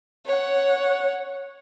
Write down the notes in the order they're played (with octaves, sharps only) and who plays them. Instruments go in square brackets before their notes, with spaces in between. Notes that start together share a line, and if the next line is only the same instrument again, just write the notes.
[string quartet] C#5 F#5